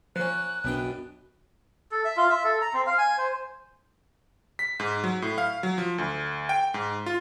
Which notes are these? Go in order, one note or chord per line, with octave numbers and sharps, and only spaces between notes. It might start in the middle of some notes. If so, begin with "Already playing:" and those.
F3 A#3 C#4 F#6
B1 F#2 B2 B3 D4 G5
A4
E5
F4
E5
A4
A#5
C4
F5
G#5
C5
B6
G#2
F#3
A2
F5
F#3
F3
D2
G5
G#2
F4